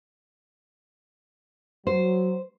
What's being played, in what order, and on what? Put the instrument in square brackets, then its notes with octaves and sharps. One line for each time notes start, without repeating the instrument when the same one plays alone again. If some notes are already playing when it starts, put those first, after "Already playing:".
[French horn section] F#3 [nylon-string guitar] C5